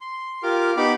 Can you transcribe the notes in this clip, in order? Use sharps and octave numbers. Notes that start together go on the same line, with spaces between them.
C6
F4 G4 A#4 D6 F6
B3 D#4 G4 B5 D6